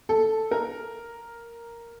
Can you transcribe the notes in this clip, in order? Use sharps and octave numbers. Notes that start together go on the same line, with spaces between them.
A4
A#4